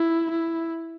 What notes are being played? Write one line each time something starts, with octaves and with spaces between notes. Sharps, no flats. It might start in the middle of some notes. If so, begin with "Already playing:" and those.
Already playing: E4
E4